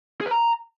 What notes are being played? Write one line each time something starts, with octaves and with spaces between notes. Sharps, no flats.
G#4
B4
A#5